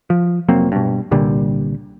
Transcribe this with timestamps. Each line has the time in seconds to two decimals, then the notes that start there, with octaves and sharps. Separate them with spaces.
0.10 F3
0.48 F1 F#3 A#3 C4
0.72 G2 B2
1.11 C2 A#2 D3 G3